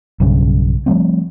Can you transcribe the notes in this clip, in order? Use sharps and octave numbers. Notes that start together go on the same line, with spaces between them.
B1 G2 C#3
F3 G3 A3 C4